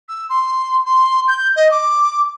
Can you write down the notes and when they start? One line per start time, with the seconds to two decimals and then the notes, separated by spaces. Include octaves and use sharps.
0.09 E6
0.29 C6
0.85 C6
1.28 G6
1.56 D#5
1.71 D6